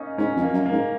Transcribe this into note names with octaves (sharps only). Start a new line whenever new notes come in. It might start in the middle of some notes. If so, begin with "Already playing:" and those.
Already playing: A#3 C#4 D#4
G#2 C#4
F2
A#3
F#2
A#3
G#2